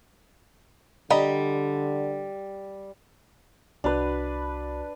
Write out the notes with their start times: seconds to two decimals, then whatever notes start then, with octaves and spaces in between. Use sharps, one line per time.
1.10 D3 G3 D#5 A#5 B5
3.84 C2 D4 F#4 B4 B5